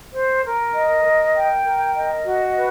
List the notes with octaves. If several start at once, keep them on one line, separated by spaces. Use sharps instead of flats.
C5
A#4
D#5
A#4
G5
A#4
D#5
F#4
B4